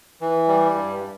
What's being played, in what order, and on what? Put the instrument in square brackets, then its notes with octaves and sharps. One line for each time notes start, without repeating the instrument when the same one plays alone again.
[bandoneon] E3
G3
G2